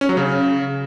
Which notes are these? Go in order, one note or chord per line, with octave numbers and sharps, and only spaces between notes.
C#4
F#3
C#3